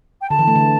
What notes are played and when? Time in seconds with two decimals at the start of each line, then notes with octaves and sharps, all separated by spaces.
0.21 G5
0.30 D3 A5
0.39 E3
0.48 A3
0.56 D3